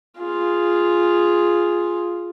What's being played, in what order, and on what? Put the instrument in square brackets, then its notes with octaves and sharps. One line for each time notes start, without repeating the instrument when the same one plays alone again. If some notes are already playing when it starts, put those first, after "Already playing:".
[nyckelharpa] F4 G#4